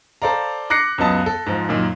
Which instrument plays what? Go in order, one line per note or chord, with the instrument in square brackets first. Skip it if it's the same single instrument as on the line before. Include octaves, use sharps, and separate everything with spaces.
[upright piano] A4 C5 D5 F5 A#5
D6 F#6 A#6 C7 C#7
C#2 F#2 B3 D#5 A5
A4
G#2 F3
F#2 A#2 D#3